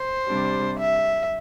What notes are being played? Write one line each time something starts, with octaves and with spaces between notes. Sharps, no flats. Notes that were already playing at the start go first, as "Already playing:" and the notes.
Already playing: C5
C3 G3 D4
E5